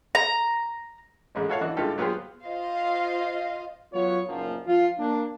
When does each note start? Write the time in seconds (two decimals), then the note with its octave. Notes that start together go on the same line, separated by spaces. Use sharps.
0.15 A#5
1.35 A1 G#3 C#4
1.48 E4 F#4 A4 C#5 F5 F#5
1.61 E3 D4 F#4 D#5
1.77 G2 D3 G#3 F4 G4 A4
1.98 F#3 B3 F4 G4 G#4 C5
2.44 F4 C5 D#5 F5
3.93 F#3 B3 F4 C#5
4.27 F#1 B1 F#2 A#2 F3
4.67 F3 F4
4.98 A#3 D4